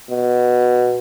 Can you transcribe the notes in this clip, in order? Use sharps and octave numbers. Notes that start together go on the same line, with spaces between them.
B2